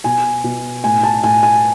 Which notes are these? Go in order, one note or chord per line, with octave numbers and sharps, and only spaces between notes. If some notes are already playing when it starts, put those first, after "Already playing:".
B2 G#5
B2
A2 G#5
A5
A2 G#5
G#5